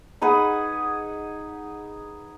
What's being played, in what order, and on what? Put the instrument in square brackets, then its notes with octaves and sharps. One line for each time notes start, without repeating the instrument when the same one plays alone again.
[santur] D#4 G#4 B4 F#5